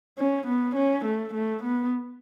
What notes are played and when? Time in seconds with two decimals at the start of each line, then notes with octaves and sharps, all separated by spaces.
0.18 C#4
0.47 B3
0.76 C#4
1.05 A3
1.34 A3
1.63 B3